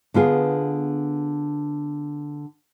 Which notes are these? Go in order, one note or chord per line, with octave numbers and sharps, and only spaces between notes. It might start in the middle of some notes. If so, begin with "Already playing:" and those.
D3 B3 F4 G#4